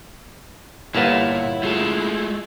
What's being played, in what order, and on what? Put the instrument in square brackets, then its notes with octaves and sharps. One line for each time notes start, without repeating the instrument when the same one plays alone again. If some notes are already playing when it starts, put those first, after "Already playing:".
[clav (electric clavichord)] G1 A#3 B3 [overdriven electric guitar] A#2 [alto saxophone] E4 [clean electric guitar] C#5 E5 A5
[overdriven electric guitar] G#3 A3 [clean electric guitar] F4 G#4 A5